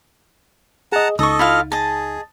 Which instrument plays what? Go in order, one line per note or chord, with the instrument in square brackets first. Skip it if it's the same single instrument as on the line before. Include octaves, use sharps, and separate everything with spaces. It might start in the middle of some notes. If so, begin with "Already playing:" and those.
[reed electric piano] G#4 D#5 [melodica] F#5 A5 A#5
[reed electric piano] C#2 D#4 [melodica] A4 D#5 [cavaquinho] C#6 D#6
[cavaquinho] E4 F4 F5
[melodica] G#4 [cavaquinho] D#5 A5